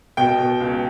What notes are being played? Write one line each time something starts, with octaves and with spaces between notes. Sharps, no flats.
B2 G5
B2
C#2